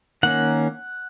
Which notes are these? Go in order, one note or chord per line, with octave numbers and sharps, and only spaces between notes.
D#3 A#3 C#4 F#5